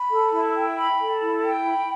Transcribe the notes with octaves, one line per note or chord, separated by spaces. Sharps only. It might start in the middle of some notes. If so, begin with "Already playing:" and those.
Already playing: B5
A4
E4
G5
B5
A4
E4
G5
B5